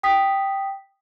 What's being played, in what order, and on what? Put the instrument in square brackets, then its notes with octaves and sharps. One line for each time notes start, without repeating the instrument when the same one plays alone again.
[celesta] G5 D#6 B6